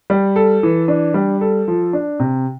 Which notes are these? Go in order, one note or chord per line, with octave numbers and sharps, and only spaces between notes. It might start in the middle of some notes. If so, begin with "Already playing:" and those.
G3
A4
E3
D4
G3
A4
F3
D4
C3